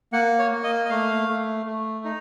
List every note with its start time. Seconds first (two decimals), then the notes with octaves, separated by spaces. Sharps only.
0.13 A#3 F#5
0.39 C#5
0.51 A#3
0.64 D#5
0.85 D#5
0.90 A3 F5
1.29 A3
1.66 A3
2.05 D#4